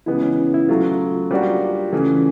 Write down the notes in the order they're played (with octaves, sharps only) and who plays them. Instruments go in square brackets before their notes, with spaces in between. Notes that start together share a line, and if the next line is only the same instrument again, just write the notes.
[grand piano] C#3 E3 G#3 B3 [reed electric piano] E4
[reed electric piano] C#4
E4
[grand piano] C#3 F#3 A3 [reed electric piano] F4
[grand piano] G3 A#3 D4 F#4 [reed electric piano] F4
[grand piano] C#3 E3 A3